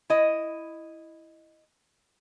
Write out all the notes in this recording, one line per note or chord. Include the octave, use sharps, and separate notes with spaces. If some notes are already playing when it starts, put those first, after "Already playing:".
E4 D#5